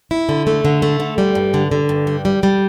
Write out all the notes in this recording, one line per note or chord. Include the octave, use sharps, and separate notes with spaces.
E4
D3
A3
D3
A3
D3
G3
G2
D3
D3
G2
G3
G3
G3